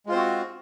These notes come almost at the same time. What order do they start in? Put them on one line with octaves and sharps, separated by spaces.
G#3 F4 C5 C4 F#4